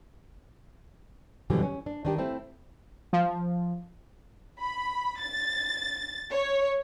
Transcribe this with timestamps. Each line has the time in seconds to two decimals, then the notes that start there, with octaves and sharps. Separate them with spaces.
1.50 F2 B2 D3 E3 F#3 G3
1.63 C#4
1.86 D4
2.05 D#3 D4 G4
2.18 A3 C4 E4
3.13 F3
4.60 B5
5.22 A6
6.31 C#5